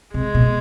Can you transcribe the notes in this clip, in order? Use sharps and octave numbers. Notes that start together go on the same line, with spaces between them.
C3 G#3
B2